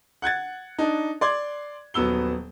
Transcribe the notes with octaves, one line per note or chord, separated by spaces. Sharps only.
F#5 F#6 G#6 A6
D4 D#4
D5 C6 D6 G#6
D#1 F#3 B3 E6 G7